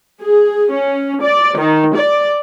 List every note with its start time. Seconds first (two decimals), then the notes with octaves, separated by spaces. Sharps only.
0.21 G#4
0.71 C#4
1.22 D5
1.57 D#3
1.95 D5